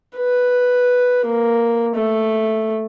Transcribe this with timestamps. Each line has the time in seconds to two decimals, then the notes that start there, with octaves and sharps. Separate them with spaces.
0.17 B4
1.25 A#3
1.95 A3